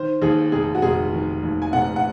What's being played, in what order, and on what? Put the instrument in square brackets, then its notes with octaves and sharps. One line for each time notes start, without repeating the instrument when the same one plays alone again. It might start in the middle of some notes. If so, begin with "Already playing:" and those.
Already playing: [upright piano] D#3 C5
D#2 G#4
F1 G#4
F#4
F1 G#4
D#3
D#2
G#5
F1 F#5
F#5